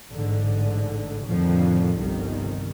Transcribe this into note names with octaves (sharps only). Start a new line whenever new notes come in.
A1 G#2 D3
F2 A2 D3 D#3 F3
G1 C2 D#3